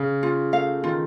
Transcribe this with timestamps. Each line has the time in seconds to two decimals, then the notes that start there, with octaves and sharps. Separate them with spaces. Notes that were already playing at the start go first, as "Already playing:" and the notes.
Already playing: C#3
0.23 F4
0.53 A3 F5
0.84 D#3 F4